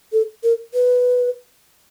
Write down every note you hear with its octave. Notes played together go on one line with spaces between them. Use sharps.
A4
A#4
B4